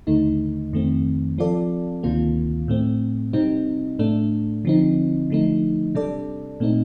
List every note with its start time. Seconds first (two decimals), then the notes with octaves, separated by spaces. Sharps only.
0.07 D#2 D3 A3 D#4
0.73 F2 D#3 A3 C4
1.38 F3 C4 F4 A4 D5
2.03 D2 C3 D#3 A#3 F4
2.68 A2 A3 C4
3.33 C3 G3 C4 D#4
3.99 A2 A3 D4
4.65 D3 F3 C4 D#4
5.30 D3 F3 A3 D#4
5.95 C3 G3 D4 A4 D5
6.60 A#2 A3 C4 D#4